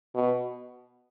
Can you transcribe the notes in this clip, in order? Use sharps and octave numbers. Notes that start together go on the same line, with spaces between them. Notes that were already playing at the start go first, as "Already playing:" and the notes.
B2